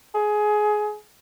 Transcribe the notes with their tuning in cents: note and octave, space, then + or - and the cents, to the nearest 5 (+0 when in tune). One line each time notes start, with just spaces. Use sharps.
G#4 +20